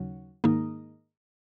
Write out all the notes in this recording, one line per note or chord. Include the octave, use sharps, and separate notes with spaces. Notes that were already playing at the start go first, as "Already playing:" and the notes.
Already playing: D#2 C#3 F#3
G#2 D#3 A#3 D#4